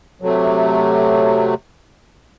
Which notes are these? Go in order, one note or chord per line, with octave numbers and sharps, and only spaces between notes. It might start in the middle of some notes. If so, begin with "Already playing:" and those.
C3 F#3 A3